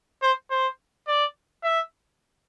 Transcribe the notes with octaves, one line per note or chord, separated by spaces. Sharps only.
C5
C5
D5
E5